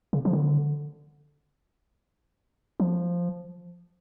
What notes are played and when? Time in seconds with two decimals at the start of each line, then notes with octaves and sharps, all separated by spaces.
0.13 C#3
0.25 F3
0.33 D3
2.80 F3